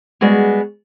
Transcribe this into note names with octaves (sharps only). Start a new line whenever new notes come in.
G3 G#3 B3 F#4 G#4